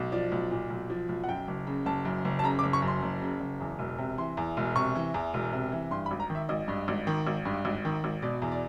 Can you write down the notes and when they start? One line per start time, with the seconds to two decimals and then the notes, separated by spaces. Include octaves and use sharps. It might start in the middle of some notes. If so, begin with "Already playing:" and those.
Already playing: B1
0.12 F3 D5
0.32 B1
0.51 A#2
0.70 B1
0.90 F3
1.09 B1
1.24 F#5
1.28 F#2 G5
1.48 F#1
1.67 C#3
1.86 F#1 A5
2.05 F#2
2.25 F#1
2.39 A5
2.43 C#3 A#5
2.59 D6
2.63 F#1
2.73 C#6
2.82 F#2
2.88 C6
3.03 F#1
3.21 C#3
3.40 F#1
3.60 E2
3.79 E1
3.98 C3
4.18 E3 C6
4.37 E2
4.57 E1
4.75 C3 C#6
4.95 E3
5.14 E2
5.34 E1
5.53 C3
5.72 E3
5.91 G2 C6
6.06 B5
6.11 G#1
6.20 A#5
6.30 D#3
6.35 E5
6.49 G#1 D#5
6.68 G2
6.88 G#1
7.07 D#3
7.27 G#1
7.45 G2
7.65 G#1
7.85 D#3
8.04 G#1
8.22 B2 D5
8.42 E2
8.52 D5